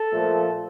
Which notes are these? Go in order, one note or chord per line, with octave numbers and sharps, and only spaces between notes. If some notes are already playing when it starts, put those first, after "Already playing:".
Already playing: A4
A#2 F3 A3